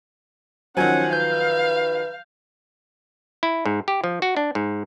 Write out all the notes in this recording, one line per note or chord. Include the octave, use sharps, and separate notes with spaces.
D#3 F3 F#3 C#4 C5 F#5 G#5 G#6
B4 F5 G6
E4
G#2
G4
F3
F#4
D4
G#2